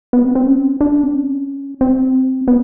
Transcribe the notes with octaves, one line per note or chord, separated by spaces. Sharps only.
B3
C4
C4
C#4
D4
C4
C#4
C4
B3